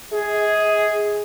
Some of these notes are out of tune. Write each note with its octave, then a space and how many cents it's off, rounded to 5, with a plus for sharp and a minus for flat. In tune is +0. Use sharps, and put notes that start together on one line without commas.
G#4 +0 D#5 +45